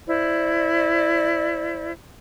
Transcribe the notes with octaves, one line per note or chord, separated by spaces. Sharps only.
E4 C5 D5